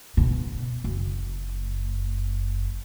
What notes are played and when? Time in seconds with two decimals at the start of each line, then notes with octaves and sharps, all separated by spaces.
0.17 B2
0.84 F#1